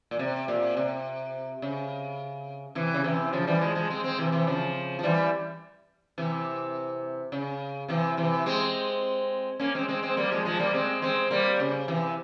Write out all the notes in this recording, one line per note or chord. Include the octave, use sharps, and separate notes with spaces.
A#2
C3
A#2
C3
C#3
C3 E3
C#3
C3 E3
C#3 F3
E3 G3
F3 G#3
F3 G#3
G#3 C4
G#3 C4
C3 E3
C3 E3
C#3 F3
F3
E3 G3
C3 E3
C#3
C3 E3
C3 E3
G#3 C4
A#3 C#4
G#3 C4
G#3 C4
G#3 C4
G3 A#3
F3 G#3
F3 G#3
G3 A#3
G#3 C4
G#3 C4
G3 A#3
C#3
C3 E3